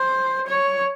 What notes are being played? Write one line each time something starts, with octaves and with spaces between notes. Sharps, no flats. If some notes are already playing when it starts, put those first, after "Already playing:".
Already playing: C5
C#5